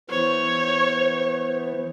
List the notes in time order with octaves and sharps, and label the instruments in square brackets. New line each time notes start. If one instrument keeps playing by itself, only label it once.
[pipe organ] E3 B3 [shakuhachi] C5 [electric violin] C#5